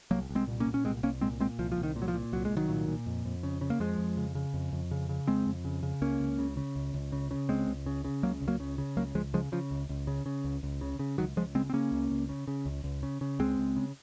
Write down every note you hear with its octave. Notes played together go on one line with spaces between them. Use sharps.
C2 F#3 A#3
C2
G#3 C4
A#2
A#3 C#4
A#2
C#4
C2 G#3 C4
C2 A#3 C#4
A#2 G#3 C4
A#2 G#3 C4
C2 F3
F3
C2
D#3
A#2
F#3
F3
A#2
C2 F#3
G#3
C2
D#3 F#3
A#2
A#2
F2
F2
C#3
C#3
A#3
F2 F3 G#3
F2
C#3
C#3
F2
F2
C#3
C#3
F2 G#3 C4
F2
C#3
C#3
C#2 A#3 C#4
C#2
C#3
C#3
C#2
C#2
C#3
C#3
C#2 G#3 C4
C#2
C#3
C#3
C#2 F#3 A#3
C#2
F#3 A#3
C#3
C#3
C#2 F#3 A#3
C#2 F3 G#3
C#3 F3 G#3
C#3 F3
C#2
C#2
C#3
C#3
C#2
C#2
C#3
C#3
C#2 D#3 F#3
C#2 F3 G#3
C#3 G#3 C4
C4
C#3 A#3 C#4
C#2
C#2
C#3
C#3
C#2
C#2
C#3
C#3
C#2 G#3 C4
C#2
C#3